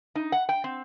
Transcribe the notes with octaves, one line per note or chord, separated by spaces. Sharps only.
D#4
F#5
G5
C4